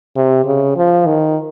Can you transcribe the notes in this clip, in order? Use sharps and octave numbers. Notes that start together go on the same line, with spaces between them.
C3
C#3
F3
D#3